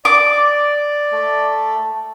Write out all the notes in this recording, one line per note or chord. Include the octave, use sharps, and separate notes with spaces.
D5 D6
A3